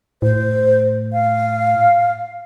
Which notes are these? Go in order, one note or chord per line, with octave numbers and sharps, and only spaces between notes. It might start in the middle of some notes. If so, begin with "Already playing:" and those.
A2 C5
F5